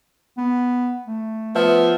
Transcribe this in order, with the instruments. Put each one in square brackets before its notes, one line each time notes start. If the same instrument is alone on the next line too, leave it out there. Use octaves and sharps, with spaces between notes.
[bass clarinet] B3
A3
[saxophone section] F3 B3 E5